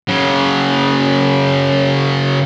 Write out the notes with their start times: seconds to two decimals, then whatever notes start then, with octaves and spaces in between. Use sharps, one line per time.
0.08 C#3 F#3